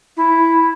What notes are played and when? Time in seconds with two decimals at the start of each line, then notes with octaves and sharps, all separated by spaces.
0.17 E4